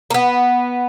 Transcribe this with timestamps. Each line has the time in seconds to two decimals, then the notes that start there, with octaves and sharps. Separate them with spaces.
0.11 A#3
0.14 B3